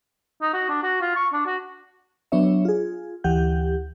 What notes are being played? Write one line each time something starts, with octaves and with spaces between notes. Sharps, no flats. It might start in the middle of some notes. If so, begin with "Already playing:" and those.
D#4
F#4
D4
F#4
F4
C#6
D4
F#4
F#3 B3 D4 C#5 E5
F4 G#4
D2 E3 G4 F#5 G6